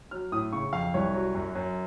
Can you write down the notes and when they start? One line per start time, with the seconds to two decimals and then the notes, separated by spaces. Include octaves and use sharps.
0.11 F#3 F6
0.32 A2 D#6
0.52 C#3 C#6
0.73 F2 F5
0.94 C2 C#5
1.14 F#3
1.35 F#2
1.55 F#2